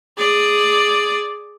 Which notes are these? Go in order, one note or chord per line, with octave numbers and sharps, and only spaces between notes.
G#4 D5